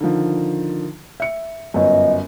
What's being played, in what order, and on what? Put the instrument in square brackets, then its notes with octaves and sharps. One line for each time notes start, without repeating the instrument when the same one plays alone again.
[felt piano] D3 D#3 F3
E5 C#7
[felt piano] G1 F#2 [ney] D#5